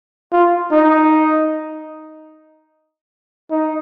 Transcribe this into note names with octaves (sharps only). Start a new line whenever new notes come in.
F4
D#4
D#4